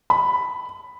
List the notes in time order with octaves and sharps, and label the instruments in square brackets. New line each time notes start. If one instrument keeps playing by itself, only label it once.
[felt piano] B5